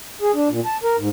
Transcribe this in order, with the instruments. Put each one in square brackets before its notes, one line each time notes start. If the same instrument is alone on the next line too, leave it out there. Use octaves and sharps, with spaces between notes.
[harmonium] G#4
D4
A#2
A5
A#4
G#2